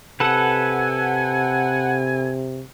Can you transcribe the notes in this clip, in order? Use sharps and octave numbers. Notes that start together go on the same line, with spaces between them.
C3 A4 B4 F#5 G#5